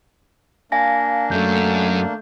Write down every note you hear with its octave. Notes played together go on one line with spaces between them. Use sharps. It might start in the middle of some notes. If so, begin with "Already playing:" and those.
A#3 D4 F5 G#5 A#6
F#2 A3 G6